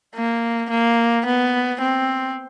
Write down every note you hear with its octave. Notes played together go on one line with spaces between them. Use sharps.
A#3
A#3
B3
C4